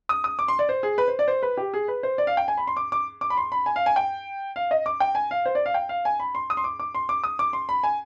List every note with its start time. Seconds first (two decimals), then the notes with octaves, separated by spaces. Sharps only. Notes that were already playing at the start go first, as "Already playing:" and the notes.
0.09 D#6
0.24 D#6
0.39 D6
0.48 C6
0.59 D5
0.69 C5
0.83 G#4
0.98 B4
1.08 C5
1.19 D5
1.28 C5
1.43 B4
1.57 G4
1.74 G#4
1.88 B4
2.03 C5
2.18 D5
2.27 F5
2.37 G5
2.48 G#5
2.57 B5
2.67 C6
2.77 D6
2.92 D6
3.21 D6
3.30 B5
3.37 C6
3.52 B5
3.66 G#5
3.76 F5
3.86 G#5
3.96 G5
4.56 F5
4.71 D#5
4.86 D6
5.00 G5
5.15 G#5
5.31 F5
5.46 C5
5.55 D5
5.66 F5
5.74 G5
5.89 F5
6.05 G#5
6.20 B5
6.35 C6
6.50 D#6
6.57 C6
6.64 D6
6.80 D6
6.95 C6
7.09 D6
7.24 D#6
7.39 D6
7.53 C6
7.69 B5
7.83 G#5